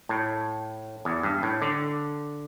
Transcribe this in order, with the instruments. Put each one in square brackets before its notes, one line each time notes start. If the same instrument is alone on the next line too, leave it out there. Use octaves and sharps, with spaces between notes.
[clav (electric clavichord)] A2
E2
G2
A2
D3